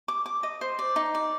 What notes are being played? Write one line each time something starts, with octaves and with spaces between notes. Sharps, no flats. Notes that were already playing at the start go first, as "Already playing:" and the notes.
D6
D6
D#5
C5
D5
D#4
D5